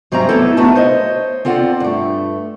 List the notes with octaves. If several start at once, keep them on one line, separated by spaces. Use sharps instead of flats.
G#2 F#3 G3 C4 E5 A#5
F#3 A3 B3 E4 A4
A3 B3 D#4 F#4 A5
C5 C#5 D#5
C4 F4 A4 D5 F#5
G2 A3